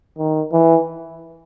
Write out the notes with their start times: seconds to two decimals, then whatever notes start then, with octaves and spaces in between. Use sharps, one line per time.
0.18 D#3
0.52 E3